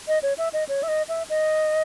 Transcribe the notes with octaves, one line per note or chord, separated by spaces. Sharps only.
D#5
C#5
E5
D#5
C#5
E5
D#5
E5
D#5